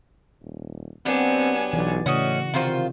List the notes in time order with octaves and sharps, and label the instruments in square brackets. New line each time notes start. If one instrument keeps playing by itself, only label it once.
[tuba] D#1
[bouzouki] F#3 D4 G4 [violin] B3 G#5 [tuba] C4
[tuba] B1 [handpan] E3 D5
[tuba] A2 [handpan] C#3 [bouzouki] C#4 D#5 [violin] F#4
[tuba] C3 [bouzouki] D#3 F4 C5